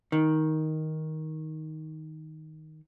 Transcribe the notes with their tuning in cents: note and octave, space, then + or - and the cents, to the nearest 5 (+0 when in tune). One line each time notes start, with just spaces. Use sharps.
D#3 +10